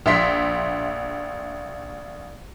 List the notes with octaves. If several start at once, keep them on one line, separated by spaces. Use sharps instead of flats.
A#1 E5 C6 B6